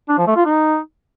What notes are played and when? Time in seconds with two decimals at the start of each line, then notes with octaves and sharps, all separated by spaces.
0.09 D4
0.18 F3
0.27 A3
0.36 F4
0.45 D#4